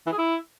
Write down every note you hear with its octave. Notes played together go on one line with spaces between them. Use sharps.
E3
G#4
E4